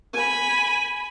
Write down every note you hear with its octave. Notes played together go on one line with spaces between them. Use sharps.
G#5 B5